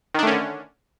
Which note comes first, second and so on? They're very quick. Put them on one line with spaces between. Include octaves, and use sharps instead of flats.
D#3 D4 A3 C#4 D3